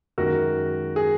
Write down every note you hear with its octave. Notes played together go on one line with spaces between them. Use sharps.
F#2 D#3 G#3 F#4 A#4
G#4